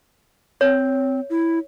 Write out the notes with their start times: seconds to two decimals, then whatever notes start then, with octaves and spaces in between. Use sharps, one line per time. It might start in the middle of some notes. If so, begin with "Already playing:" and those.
0.61 C4 C#5
1.30 E4